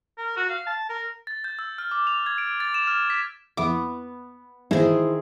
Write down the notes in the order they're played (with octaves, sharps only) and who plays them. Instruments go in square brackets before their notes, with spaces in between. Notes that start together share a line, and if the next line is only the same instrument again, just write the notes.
[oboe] A#4
F#4
F5
A5
A#4
[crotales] A6
G6
E6
F6
D6
F7
G#6
D7
A6
E7
F6
B6
[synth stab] F2 E4 D6 [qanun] B3
[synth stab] A#2 E3 G#3 [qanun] D#3 G#4 [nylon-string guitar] E4 C5